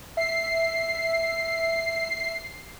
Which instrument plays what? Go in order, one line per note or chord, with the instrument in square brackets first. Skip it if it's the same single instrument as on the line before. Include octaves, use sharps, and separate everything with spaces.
[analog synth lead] E5 [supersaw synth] C7